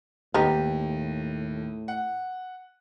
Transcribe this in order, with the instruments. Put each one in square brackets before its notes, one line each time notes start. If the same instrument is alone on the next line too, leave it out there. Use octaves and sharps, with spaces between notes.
[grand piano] D#2 [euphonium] A2 [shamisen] B3 D#4 D#5 [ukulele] G4
[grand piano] F#5